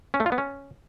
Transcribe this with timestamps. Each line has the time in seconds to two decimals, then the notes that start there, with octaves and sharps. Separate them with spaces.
0.14 C#4
0.20 A3
0.26 F4
0.32 B3
0.38 C#4